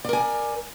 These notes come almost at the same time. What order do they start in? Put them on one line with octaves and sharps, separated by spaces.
D5 A#4 G#5